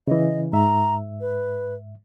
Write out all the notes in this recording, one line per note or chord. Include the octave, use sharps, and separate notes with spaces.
C#3 E3 D#5
G#2 E5 A#5
B4